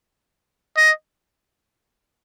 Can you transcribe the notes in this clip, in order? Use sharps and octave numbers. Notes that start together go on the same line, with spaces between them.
D#5